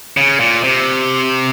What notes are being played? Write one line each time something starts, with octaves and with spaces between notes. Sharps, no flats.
C#3
A#2
C3